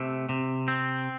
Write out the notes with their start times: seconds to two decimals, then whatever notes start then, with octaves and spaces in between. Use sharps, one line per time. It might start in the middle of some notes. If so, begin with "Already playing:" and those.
Already playing: C3 A3
0.29 C3
0.68 C4